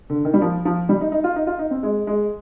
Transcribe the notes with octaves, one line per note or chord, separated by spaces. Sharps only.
D3
D#3
G3
F3
F3
G3
D#4
D#4
F4
D#4
F4
D#4
C4
G#3
G#3